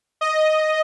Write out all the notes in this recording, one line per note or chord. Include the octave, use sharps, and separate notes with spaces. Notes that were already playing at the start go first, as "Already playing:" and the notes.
D#5